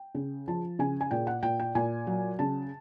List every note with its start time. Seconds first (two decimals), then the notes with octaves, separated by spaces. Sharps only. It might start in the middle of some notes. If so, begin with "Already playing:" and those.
Already playing: G5
0.15 C#3
0.48 F3 A5
0.79 C#3 G#5
1.01 G#5
1.11 A#2 G5
1.27 F#5
1.43 A#2 G5
1.60 G5
1.75 A#2 G#5
2.07 F#3
2.39 C#3 A5